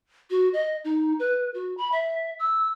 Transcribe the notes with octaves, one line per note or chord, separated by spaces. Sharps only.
F#4
D#5
D#4
B4
F#4
B5
E5
E6